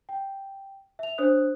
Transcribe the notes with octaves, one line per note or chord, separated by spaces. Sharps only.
G5
E5 F7
D4 C5 C#5 D#6 F#6